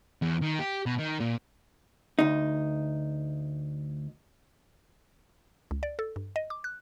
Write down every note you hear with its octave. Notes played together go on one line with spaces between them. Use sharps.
E2
D#3
G4
B2
D#3
A#2
D2 D#4
C#2
D5
A4
G2
D#5
D6
F#6